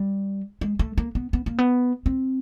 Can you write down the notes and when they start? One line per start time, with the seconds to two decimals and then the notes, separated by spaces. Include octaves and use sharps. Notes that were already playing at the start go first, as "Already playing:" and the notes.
Already playing: G3
0.61 G#3
0.79 A3
0.98 A#3
1.15 B3
1.33 B3
1.46 A#3
1.58 B3
2.06 C4